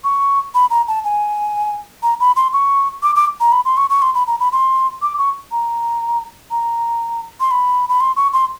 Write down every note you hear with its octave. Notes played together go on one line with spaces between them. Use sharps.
C#6
B5
A#5
A5
G#5
A#5
B5
C6
C#6
D6
D6
A#5
B5
C6
C#6
C#6
C6
B5
A#5
B5
C6
D6
C#6
A#5
A#5
C6
B5
B5
C6
C#6
C6